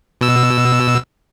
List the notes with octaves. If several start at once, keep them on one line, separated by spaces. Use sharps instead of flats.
B2 E6